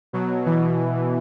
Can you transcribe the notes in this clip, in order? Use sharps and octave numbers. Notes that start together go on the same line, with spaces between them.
B2 F#3
B2 E3